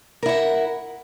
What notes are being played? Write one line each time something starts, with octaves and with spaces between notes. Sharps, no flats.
E4 A#4 F#5